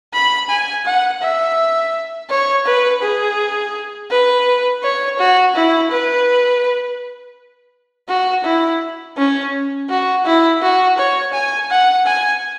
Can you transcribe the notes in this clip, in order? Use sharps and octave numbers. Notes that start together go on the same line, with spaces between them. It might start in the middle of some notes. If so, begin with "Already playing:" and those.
B5
G#5
F#5
E5
C#5
B4
G#4
B4
C#5
F#4
E4
B4
F#4
E4
C#4
F#4
E4
F#4
C#5
G#5
F#5
G#5